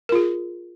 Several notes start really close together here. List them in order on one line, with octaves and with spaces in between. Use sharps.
A#4 F4 G#4